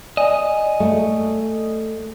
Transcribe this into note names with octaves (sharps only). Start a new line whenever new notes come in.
D5 D#5 G#5
A3